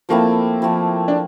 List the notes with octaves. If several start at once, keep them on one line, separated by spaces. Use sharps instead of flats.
F3 A3 A#3 C4 E4
F3 A3 C4 E4
D4